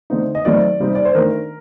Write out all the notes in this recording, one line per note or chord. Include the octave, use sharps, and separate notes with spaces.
D3 A3 C4 D#4
D#5
D#3 F#3 A3 C4 D5
C3 G3 C4 D#4
D5
C5
D#3 A3 D4 A#4